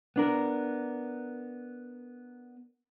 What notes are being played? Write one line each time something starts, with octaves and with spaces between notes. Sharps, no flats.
B3 D4 A#4